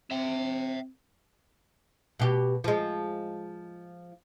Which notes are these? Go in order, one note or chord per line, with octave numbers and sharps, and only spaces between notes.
C4 E5 G5
B2 G4
F3 G#3